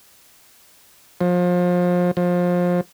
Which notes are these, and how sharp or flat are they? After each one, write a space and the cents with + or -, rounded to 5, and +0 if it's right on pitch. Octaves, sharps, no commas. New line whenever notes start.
F3 +30
F3 +25